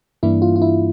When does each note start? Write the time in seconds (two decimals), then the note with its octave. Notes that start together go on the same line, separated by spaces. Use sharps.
0.23 G2 E3 A#3 D4 E4
0.42 F4
0.56 F4
0.62 E4